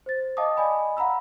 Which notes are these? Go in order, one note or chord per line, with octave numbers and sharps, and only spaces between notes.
C5 A6
D#5 F5 G5 A5 D6 D#6
D5 D#5 G#5 B5
F5 F#5 A#5 B5 E6